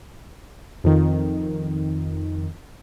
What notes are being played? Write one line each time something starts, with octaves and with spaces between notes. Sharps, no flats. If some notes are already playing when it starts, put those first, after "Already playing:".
F2 D#3